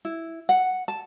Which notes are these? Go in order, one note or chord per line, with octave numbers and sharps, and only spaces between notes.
E4
F#5
A5